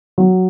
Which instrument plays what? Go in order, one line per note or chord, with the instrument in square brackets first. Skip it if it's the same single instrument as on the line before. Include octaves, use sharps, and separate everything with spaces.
[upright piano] F#3